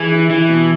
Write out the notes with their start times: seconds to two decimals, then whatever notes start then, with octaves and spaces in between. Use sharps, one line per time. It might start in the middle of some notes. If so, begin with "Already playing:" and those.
Already playing: E3 G#4
0.11 E4
0.30 E3 E4
0.49 B2